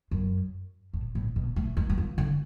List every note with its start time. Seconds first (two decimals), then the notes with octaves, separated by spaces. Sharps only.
0.11 F#2
0.93 A2
1.15 A2
1.36 B2
1.56 A3
1.77 G#3
1.90 F#3
1.98 F3
2.18 D3